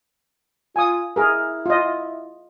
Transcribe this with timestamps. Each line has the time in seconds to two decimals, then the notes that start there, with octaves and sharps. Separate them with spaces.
0.76 F4 G#5 D#6
1.16 E4 G#4 A#4
1.66 F4 D#5